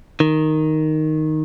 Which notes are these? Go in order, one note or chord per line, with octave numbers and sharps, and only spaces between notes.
D#3